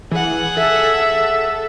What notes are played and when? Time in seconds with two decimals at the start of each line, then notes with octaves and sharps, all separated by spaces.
0.11 E3 G#4 F#5
0.57 A4 E5